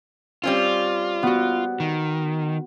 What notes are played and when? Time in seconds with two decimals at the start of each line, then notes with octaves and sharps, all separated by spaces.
0.44 G3 C4 C#4 F4
1.23 B3 F#4
1.80 D#3